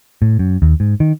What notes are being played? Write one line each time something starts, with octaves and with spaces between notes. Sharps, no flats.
A2
F#2
D#2
G#2
D#3